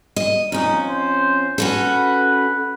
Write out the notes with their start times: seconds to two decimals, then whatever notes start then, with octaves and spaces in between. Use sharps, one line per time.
0.16 D#5
0.52 F2 C#4 D#4
0.90 C5
1.58 C#4 F#4 A4 B4